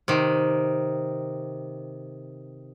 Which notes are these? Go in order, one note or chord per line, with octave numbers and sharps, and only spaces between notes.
C3 D#3